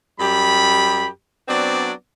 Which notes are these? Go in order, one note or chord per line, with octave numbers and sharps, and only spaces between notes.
F#2 G3 G4 B5
F#3 B3 C4 D4 D5